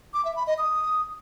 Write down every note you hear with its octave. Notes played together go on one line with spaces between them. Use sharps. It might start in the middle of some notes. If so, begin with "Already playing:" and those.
D6
E5
B5
D#5
D#6